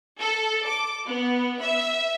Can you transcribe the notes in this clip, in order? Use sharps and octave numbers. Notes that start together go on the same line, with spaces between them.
A4
D6
B3
E5